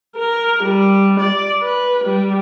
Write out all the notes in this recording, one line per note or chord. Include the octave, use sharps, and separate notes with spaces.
A#4
G3
D5
B4
G3